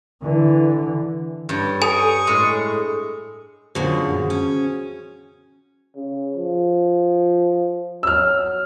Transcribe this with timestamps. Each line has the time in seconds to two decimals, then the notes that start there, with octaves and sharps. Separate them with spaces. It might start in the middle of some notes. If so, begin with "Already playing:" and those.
0.22 D3 E3
1.49 G2 C#5
1.82 A4 G#5 C#6 D#6
2.27 A2 G#3
3.75 F#2 A#2 D3 F#4 G#4 C5
4.30 C#4
5.95 C#3
6.36 F3
8.03 F#3 E6 F6